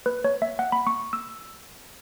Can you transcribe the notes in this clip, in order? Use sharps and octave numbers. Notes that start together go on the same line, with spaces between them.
B4
C#5
E5
F#5
B5
C#6
E6